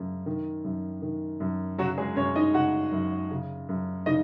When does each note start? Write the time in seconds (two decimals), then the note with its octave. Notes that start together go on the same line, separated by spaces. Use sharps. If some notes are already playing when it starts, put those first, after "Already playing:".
Already playing: F#2 C#3
0.26 D#3
0.65 F#2
1.02 D#3
1.40 F#2
1.78 C#3 F#3 F#4
1.98 G#3 G#4
2.16 F#2 C#4 C#5
2.36 D#4 D#5
2.54 C#3 F#4 F#5
2.92 F#2
3.31 C#3
3.69 F#2
4.06 C#3 D#4 D#5